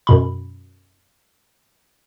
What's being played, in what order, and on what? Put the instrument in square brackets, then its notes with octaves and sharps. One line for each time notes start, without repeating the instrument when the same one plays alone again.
[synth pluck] F#2 B2 B5